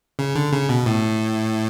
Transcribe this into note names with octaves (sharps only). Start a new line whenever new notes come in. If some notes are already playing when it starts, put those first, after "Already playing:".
C#3
D3
C#3
B2
A2